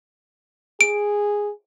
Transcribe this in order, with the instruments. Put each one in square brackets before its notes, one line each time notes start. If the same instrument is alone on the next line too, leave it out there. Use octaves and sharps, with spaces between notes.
[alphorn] G#4 [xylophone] D7